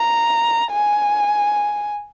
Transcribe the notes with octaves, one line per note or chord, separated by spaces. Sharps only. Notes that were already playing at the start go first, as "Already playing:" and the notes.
Already playing: A#5
G#5